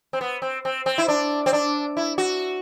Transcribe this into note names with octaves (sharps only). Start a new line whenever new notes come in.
C4
B3
C4
C4
C4
E4
D4
C4
D4
E4
F#4